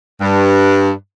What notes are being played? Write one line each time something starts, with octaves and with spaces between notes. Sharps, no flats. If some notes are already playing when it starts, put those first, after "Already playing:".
G2